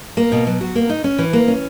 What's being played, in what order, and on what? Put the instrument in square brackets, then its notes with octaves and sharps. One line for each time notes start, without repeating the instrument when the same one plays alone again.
[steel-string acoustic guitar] A#3
B2
F#3
F#4
A#3
D#4
C#4
E3
A#3
C#4